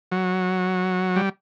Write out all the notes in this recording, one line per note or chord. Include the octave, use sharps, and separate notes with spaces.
F#3
G3